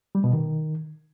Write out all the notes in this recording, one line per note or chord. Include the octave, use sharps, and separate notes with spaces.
G3
B2
D#3